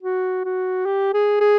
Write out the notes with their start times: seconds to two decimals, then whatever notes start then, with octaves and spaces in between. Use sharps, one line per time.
0.03 F#4
0.45 F#4
0.85 G4
1.14 G#4
1.41 G#4